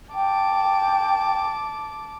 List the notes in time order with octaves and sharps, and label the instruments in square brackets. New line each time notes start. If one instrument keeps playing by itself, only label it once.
[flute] G5 [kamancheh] A5 D6